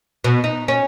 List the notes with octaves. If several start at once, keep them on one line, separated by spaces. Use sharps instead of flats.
B2
D#4
C#4